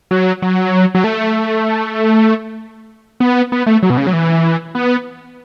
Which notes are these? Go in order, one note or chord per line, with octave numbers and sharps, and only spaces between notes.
F#3
F#3
F#3
A3
B3
B3
A3
F#3
B2
C#3
F#3
E3
B3